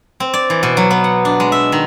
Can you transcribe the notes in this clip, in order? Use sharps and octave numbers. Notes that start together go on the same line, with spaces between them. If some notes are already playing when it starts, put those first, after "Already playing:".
C4
D5
E3
B2
F#3
B3
F#5
D4
G#3
E5
D#3